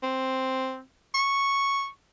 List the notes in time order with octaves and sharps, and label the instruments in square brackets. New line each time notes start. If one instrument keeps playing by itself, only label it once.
[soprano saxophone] C4
C#6